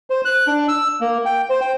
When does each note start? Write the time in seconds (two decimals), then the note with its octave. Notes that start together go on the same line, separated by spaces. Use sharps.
0.10 C5
0.25 F#6
0.47 D4
0.68 E6
1.01 A#3
1.26 G5
1.50 C5
1.61 G5